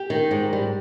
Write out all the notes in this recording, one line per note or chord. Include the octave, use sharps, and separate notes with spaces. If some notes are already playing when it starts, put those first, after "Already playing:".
Already playing: G4
D#3
G#2
G3